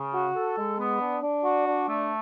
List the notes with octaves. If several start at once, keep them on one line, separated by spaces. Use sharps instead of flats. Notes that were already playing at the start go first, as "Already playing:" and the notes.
Already playing: C#3
F#4
A4
G#3
B3
D4
D4
F#4
D4
A3